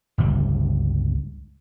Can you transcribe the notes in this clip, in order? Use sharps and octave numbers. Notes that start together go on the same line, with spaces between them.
G1 C#2 G3